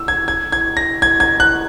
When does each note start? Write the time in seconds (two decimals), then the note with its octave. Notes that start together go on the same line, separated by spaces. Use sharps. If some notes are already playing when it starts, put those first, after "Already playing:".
Already playing: E6
0.08 G#6
0.28 G#6
0.52 G#6
0.77 A#6
1.02 G#6
1.20 G#6
1.40 F#6